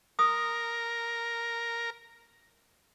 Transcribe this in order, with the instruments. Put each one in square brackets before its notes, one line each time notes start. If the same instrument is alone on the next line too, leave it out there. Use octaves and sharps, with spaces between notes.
[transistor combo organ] A#4 [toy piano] D#6